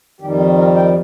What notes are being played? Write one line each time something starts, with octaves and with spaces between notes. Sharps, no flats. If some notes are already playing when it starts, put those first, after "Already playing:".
F2 D#3 G3 G4
G4
A#4
G5